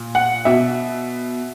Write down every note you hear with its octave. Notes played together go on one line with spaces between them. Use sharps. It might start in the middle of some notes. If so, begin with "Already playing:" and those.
Already playing: A#2
F#5
B2 E5